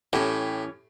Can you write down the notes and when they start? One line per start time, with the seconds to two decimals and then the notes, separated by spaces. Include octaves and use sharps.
0.13 A2 E3 C#4 G4